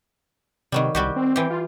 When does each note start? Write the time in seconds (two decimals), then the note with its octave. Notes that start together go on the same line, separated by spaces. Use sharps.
0.72 C3 D#3 F#3 G3
0.95 C2 G3 F#4 G4
1.16 C4
1.36 E3 G4
1.50 F4